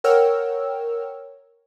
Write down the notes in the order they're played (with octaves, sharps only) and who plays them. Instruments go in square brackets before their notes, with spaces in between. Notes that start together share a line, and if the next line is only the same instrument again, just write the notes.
[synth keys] A#4 C#5 F#5 G5 E6 F6